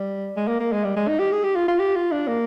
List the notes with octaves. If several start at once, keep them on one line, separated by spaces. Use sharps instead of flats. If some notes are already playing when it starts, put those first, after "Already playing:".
Already playing: G3
G#3
A#3
A#3
G#3
G3
G#3
D#4
G4
G#4
G4
F4
F4
G4
F4
D4
A#3